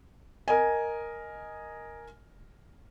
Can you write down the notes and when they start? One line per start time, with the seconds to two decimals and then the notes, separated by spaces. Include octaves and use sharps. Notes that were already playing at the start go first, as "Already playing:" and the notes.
0.48 A#4 D#5 G#5